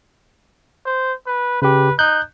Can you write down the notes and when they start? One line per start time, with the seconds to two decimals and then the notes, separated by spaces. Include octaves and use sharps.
0.85 C5
1.27 B4
1.62 C#3 G4 B4
1.99 D#4 F#6 G6